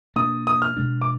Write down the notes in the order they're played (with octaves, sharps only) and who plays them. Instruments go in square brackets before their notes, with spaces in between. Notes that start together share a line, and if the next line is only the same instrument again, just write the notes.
[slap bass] B2 A#3 D4 [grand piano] D#6
[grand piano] D#6
F6
[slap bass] B2 G#3 D4
[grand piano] D6